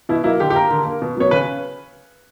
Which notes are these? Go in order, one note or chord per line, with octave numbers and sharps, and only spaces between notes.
B2 E4
F#3 A#3 E4
D3 G4
G4
A#3 A#4
D3
A#3
B2
F#3 B3 C#5
C#3 B4